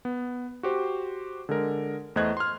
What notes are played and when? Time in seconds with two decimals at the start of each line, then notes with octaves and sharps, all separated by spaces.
0.05 B3
0.63 F#4 G4 C5
1.49 D3 G#3 A#4
2.16 E2 A3 C5 D#5 F#6 G#6
2.37 C6 F6